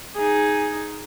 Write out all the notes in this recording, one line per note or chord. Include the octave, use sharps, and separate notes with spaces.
D#4 G#4